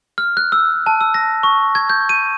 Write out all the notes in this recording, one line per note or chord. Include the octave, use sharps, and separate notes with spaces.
F6
F#6
E6
A5
E6
A#6
C#6
G#6
G6
D#7